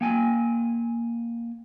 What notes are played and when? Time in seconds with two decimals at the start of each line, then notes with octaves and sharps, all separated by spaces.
0.01 A#3 G5 G#5